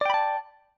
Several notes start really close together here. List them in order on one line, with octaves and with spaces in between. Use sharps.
D5 G5 B5 A5